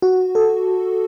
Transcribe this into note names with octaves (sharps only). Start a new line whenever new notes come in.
F#4
A4